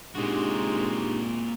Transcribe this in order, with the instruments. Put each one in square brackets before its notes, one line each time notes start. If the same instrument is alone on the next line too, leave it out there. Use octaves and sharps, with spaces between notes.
[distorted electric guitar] A#2 F#4 [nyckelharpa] G#3 C4 [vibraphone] D4 D#4 G4